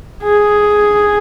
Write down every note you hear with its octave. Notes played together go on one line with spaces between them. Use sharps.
G#4